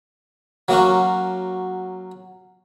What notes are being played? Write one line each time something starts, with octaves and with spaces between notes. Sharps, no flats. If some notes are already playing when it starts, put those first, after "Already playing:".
F#3 A#3 C#4 F#4